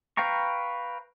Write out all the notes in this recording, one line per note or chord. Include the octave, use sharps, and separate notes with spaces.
B4 F5 G5 A#5 C#6